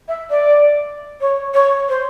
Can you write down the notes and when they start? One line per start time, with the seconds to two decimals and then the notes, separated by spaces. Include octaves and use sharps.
0.08 E5
0.30 D5
1.21 C#5
1.54 C#5
1.89 C5